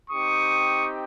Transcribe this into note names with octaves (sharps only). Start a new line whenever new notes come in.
C4 D#4 G4 C#6 D#6